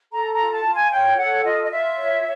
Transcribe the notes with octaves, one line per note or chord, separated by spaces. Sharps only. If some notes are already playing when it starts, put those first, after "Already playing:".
A4 A#5
A#5
F4
A5
F4
G#5
C#5 G5
A4 F#5
F4 D#5
D#5
F4 E5
C#5